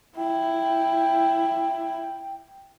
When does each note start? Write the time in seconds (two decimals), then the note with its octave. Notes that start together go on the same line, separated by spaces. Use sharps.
0.17 E4 G5